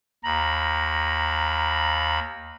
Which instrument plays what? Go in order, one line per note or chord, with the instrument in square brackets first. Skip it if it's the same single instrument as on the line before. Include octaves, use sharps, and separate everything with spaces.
[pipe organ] D#2 B5 [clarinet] A#5